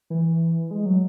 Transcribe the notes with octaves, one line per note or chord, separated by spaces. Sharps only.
E3
G#3
F#3